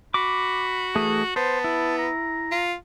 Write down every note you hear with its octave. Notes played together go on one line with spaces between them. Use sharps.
F#4 B5 D6
E3 A3 G#4
B3 C5 A5
E4
A#5
F4